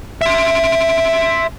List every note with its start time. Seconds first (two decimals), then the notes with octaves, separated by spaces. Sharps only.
0.21 E5 C6